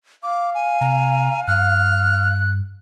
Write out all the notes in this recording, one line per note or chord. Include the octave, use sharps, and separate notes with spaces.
F5 D6
G#5
C3 A#5
G2 F6 F#6